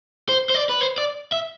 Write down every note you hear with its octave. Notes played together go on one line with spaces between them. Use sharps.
C5
C5
D5
B4
C5
D5
E5